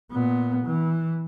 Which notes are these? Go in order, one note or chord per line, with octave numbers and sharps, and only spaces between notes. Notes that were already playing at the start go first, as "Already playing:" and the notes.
A#2 B3
E3